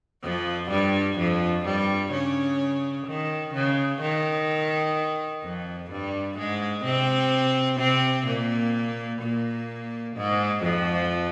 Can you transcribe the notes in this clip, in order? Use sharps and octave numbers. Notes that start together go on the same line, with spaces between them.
F2 F3
G2 G3
F2 F3
G2 G3
C#3 C#4
D#3
C#3
D#3
F2 F3
G2 G3
G#2 G#3
C3 C4
C3 C4
A#2 A#3
A#2 A#3
G#2 G#3
F2 F3